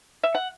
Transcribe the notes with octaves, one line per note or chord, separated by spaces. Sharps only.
E5
F#5